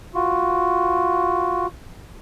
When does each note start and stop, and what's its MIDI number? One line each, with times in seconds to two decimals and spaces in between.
0.15 1.67 65
0.15 1.67 66